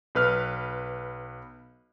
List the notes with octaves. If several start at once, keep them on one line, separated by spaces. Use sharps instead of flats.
B1 B4 F6